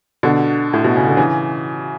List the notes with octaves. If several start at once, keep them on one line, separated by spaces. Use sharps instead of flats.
B2 D3
A2
B2
C#3
D3
C#3 E3